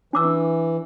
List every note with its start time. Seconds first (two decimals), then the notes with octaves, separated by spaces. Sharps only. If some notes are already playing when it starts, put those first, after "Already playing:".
0.13 E3 D4 D6 E6